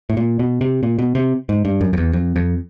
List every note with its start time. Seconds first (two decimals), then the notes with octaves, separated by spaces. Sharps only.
0.10 A2
0.17 A#2
0.39 B2
0.61 C3
0.83 A#2
0.99 B2
1.15 C3
1.49 G#2
1.65 G2
1.81 F#2
1.93 F2
1.98 E2
2.13 F2
2.36 F2